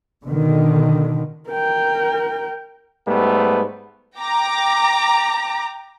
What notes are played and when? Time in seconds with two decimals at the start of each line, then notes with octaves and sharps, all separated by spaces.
0.24 B2 D3 D#3
1.49 A#4 G5
3.07 G#2 G3 A3 B3
4.18 G5 A#5 D6